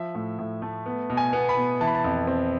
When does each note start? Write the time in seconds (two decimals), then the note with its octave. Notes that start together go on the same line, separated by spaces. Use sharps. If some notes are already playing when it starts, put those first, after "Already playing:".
Already playing: F3 E5
0.15 A2
0.39 A2
0.62 A3
0.86 B3
1.10 B2
1.17 G#5
1.33 B3
1.49 B5
1.57 B2
1.81 E3 A5
1.87 B5
1.95 A5
2.04 F2
2.27 C4